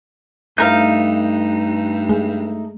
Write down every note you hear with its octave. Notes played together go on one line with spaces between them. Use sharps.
G2 E3 A3 D#4 A#4 F5 G6
G#3